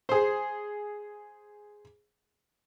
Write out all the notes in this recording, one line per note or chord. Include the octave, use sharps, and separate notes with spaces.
G#4 C5